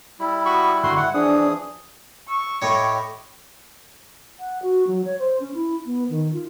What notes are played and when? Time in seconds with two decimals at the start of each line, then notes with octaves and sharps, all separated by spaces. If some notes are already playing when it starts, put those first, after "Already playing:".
0.20 G3 E4 B5
0.45 F#4 B5 C#6 D#6
0.83 G#2 D3 A3 F#4 C6 F#6
0.97 E5 F#5
1.14 E3 F3 D4 G#4 D5 D#6
2.28 C#6 E6
2.62 A2 G4 C#5 D#5 G5
4.39 F#5
4.62 F#4
4.87 F#3
5.05 C#5
5.19 C5
5.40 C#4
5.54 E4
5.86 B3
6.09 D#3
6.33 F4